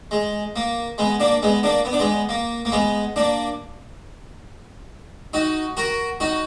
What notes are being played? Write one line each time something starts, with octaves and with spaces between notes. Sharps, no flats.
G#3
A#3
G#3 B3
A#3 D4
G#3 B3
A#3 D4
B3
D4
G#3 B3
A#3
A#3
G#3 B3
A#3 D4
D#4 F#4
F#4 A#4
D#4 F#4